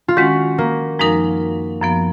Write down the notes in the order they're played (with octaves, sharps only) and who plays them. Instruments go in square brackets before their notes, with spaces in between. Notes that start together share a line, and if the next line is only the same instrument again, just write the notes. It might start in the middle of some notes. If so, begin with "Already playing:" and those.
[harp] F4
[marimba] D#3 G#3 C#4 [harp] F#4
[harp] A#3
[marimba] F#2 F3 G#3 D#4 A#4
F#2 F3 B3